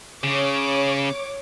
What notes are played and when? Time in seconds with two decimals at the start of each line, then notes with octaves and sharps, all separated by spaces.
0.24 C#3 C#5 D6